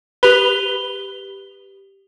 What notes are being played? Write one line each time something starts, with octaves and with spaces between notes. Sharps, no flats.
G4 B4 F7 G7